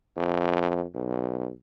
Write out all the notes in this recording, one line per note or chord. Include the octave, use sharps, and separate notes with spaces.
F2
B1